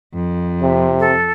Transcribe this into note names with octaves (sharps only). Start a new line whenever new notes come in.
F2
C3
A4